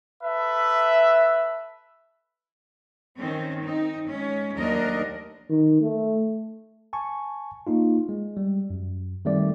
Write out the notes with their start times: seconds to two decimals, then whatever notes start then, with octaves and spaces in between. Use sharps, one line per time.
0.23 A4 B4 E5
3.17 D#3 C4 C#4
3.61 C4 D#4
4.07 G#3 C#4
4.56 D#2 F#3 A3 D4 A#4 D#5
5.50 D#3
5.81 A3
6.93 G#5 A5 C#6
7.67 A#3 D#4 F4
8.09 G#3
8.37 G3
8.70 F#2
9.25 D#3 G3 A3 C4 D5